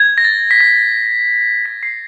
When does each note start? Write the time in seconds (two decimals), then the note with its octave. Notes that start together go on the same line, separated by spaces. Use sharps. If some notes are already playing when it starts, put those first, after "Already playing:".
Already playing: G#6
0.18 A#6
0.24 A6
0.51 B6
0.60 A#6
1.66 B6
1.83 C7